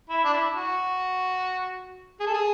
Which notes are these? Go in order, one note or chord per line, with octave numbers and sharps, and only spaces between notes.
E4
D4
E4
F#4
G#4
A4
G#4